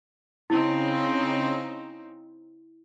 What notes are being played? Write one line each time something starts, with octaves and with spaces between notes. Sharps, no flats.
C#3 C4 D#4 E4